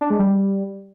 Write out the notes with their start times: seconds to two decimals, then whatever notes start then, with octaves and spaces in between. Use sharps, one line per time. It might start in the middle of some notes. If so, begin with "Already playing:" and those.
0.01 D4
0.10 G#3
0.19 G3